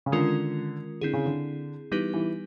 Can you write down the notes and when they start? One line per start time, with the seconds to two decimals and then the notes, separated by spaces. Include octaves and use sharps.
0.06 C#3
0.12 D3 D#3 G#3 C#4 F4 A#4
1.01 D3 C4 E4 G#4
1.13 C#3
1.26 D3
1.92 E3 G3 B3 D#4 G4 B4
2.14 E3